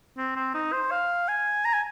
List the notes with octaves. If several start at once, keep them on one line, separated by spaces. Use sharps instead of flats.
C4
C4
D#4
C5
F5
G#5
A#5
G#5